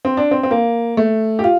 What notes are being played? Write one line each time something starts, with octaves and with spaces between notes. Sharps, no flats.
C4
D4
C4
C4
A#3
A3
G4
F4